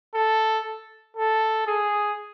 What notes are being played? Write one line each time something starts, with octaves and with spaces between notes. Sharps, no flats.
A4
A4
G#4